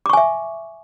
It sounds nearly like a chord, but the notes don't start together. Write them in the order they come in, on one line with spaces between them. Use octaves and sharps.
D6 C#6 G#5 E5